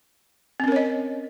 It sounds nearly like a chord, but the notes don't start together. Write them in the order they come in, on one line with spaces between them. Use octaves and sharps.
C4 C#4 A#4 C#5 D#5